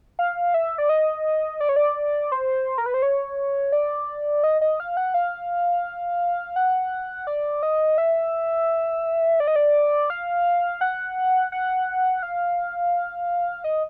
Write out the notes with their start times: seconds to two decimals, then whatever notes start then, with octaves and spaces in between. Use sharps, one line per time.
0.19 F5
0.54 E5
0.78 D5
0.89 D#5
1.60 D5
1.69 C#5
1.76 D5
2.32 C5
2.78 A#4
2.86 B4
2.94 C5
3.02 C#5
3.72 D5
4.44 D#5
4.61 D#5
4.80 F5
4.97 F#5
5.14 F5
6.56 F#5
7.27 D5
7.63 D#5
7.98 E5
9.40 D5
9.47 D#5
9.56 D5
10.10 F5
10.81 F#5
11.52 F#5
12.23 F5
13.64 D#5